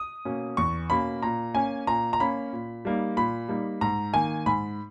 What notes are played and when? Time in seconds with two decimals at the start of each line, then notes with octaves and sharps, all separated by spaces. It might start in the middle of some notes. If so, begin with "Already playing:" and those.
Already playing: D#6
0.25 B2 A#3 C#4
0.57 E2 C#6
0.90 B2 A#3 C#4 B5
1.23 A#2 A#5
1.54 A#3 C#4 G#5
1.87 A#2 A#5
2.13 A#5
2.20 A#3 C#4 B5
2.53 A#2
2.85 G3 A#3 D#4
3.17 A#2 B5
3.48 G3 A#3 D#4
3.81 G#2 A#5
4.13 D#3 A#3 G#5
4.46 G#2 B5